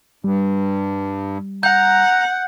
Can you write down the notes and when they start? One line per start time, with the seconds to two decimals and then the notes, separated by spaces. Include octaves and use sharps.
0.24 G2 G3
1.63 F#5 A#5 G6